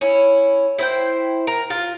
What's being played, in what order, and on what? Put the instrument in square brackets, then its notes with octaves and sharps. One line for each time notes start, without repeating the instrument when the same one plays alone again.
[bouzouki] C#4 E4
E4 C5 G5
A#4
F4